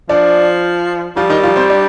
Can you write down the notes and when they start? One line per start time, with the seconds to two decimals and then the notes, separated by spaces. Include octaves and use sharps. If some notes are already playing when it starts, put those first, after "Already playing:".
0.09 F3 D4 D5
1.17 F3 G3 F4
1.30 D#3 D#4
1.43 F3 F4
1.56 C4 C5
1.70 D4 D5